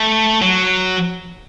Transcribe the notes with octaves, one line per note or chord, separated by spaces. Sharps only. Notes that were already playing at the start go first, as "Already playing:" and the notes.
Already playing: A3
F#3